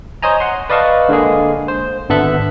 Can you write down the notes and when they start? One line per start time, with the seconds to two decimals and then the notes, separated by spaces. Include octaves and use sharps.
0.22 C5 C#5 D#5 G#5 A#5
0.40 F#5 C6
0.69 B4 D5 D#5 F5 A5 C#6
1.09 D3 G#3 A#3 G#4
1.68 C5
2.09 G#1 D3 B3 A4 E5 F#6